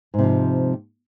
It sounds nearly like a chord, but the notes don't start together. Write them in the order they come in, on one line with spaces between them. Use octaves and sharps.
G#2 C3 F3